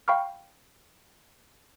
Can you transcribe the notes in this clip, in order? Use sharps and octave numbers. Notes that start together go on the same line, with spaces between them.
F5 G5 B5 C#6 F6